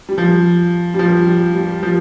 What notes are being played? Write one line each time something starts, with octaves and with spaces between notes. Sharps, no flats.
G3
F3
G3
F3
G3
G3
F3